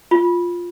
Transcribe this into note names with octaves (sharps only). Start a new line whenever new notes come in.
F4